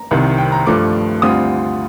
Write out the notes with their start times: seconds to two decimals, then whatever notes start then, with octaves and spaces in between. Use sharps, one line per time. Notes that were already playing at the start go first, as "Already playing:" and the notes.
Already playing: A#5
0.11 C2 C3 D#3
0.38 G5
0.52 A#5
0.67 G2 F3 A3 D6
1.22 D2 D3 G3 C4 F4 D#6